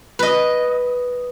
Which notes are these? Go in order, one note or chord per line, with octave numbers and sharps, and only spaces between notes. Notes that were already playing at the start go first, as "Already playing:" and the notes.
B4 D#5